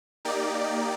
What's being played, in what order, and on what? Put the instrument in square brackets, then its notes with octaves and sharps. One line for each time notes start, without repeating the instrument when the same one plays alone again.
[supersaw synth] A#3 D#4 G4 D5